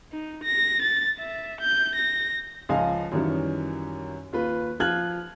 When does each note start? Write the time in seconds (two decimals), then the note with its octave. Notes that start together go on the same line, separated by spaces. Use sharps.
0.12 D#4
0.44 A#6
0.82 A6
1.19 E5
1.61 G6
1.95 A#6
2.69 C#2 F3 D#5 F5 G#5
3.11 F#2 D#3 E3 G3 C#4
4.33 D#2 F4 B4
4.80 F3 F4 F6 F#6 G#6 F#7